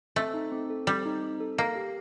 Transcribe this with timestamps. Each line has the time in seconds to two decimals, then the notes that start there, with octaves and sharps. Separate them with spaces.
0.16 A3 C4
0.34 D#4
0.52 C4
0.70 A4
0.87 G3 C4
1.05 D#4
1.23 C4
1.40 A4
1.58 A#3 F5
1.76 G4